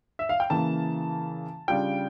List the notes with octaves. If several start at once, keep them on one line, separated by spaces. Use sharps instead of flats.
E5
F5
G5
C#3 E3 A#3 A5
C#3 G3 D4 F4 G5